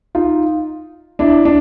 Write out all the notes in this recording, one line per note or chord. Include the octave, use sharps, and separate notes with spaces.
D#4 F4
D4 E4
D4